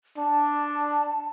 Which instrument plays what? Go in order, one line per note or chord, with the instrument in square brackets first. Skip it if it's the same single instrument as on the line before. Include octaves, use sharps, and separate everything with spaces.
[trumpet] D4 [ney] A5